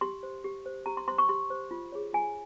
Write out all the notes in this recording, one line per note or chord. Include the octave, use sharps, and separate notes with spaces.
G4 C6
C5
G4
C5
G4 A#5
C6
C5 C6
C#6
G4 C6
C5
F4
G#4 C#5
F4 G#5